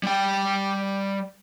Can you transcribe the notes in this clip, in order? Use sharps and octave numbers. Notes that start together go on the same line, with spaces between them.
G3 G5